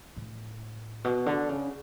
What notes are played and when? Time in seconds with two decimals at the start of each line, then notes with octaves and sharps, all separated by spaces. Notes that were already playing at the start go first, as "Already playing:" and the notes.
0.16 A2
1.04 B2
1.26 D3
1.49 C#3